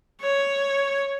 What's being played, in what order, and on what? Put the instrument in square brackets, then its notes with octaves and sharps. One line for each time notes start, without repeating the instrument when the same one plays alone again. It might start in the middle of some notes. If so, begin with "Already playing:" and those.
[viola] C#5